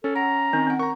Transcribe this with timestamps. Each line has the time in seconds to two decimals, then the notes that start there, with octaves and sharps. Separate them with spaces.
0.04 C#4 A4
0.16 F#5 A#5
0.53 D#3 C4 C#4
0.67 C4 F#5
0.79 A#4 A#5 C#6